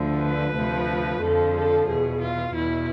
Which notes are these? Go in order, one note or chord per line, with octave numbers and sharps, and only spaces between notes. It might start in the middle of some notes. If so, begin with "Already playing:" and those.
Already playing: D2 D3 F3
B4
D2 C3 F3
F2 D3 F3 A4
A4
E2 B2 G#4
F4
E2 B2 E4